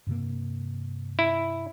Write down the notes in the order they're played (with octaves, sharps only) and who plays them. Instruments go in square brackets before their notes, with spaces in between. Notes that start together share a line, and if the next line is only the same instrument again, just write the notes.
[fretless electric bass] G2 C3 A#3
[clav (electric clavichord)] E4